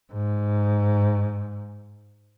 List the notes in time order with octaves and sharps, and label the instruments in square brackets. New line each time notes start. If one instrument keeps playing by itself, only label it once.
[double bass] G#2